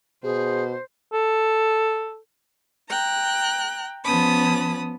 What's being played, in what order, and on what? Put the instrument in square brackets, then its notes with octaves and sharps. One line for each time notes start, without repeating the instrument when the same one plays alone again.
[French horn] B2 [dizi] G#4 [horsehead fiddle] C5
[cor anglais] A4
[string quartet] G5 A#5 F#6
F3 B3 C#4 A5 B5 D#6